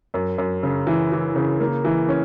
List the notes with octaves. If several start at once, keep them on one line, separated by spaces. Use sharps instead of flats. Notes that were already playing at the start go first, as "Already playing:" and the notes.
F#2
F#2
C#3
E3
E3
C#3
A#3
E3
C#4